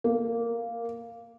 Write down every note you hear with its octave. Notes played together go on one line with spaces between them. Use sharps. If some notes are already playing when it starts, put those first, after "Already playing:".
A#3